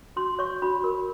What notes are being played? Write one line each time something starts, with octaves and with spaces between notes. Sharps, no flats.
F#4 C6
C#5 C#6
F#4 B5
A#4